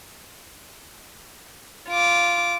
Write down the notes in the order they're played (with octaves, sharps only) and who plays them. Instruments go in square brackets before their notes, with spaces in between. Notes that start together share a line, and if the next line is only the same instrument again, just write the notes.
[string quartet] F4 D6